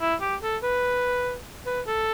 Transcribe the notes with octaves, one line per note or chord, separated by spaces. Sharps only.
E4
G4
A4
B4
B4
A4